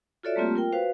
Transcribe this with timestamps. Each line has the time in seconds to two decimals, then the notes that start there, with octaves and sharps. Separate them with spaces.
0.23 F4 F#4 A4 C#5 D5 E5
0.36 G3 A3 A#3 C4 F4 G4
0.56 F4 A#4 G5
0.73 F#4 B4 C5 F5